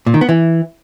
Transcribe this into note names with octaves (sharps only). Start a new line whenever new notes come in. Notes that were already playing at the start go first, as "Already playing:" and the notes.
A#2
D#3
B3
E3